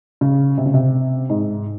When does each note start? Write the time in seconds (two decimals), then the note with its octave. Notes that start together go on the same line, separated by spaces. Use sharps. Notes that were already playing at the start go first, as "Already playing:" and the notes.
0.21 C#3
0.58 C3
0.66 C#3
0.74 C3
1.30 G#2